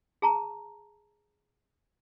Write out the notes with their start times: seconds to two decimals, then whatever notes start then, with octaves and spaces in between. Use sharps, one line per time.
0.22 G#4 A5 A#5